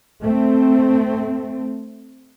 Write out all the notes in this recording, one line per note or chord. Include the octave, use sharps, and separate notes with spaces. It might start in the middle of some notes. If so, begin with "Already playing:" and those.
A3 C4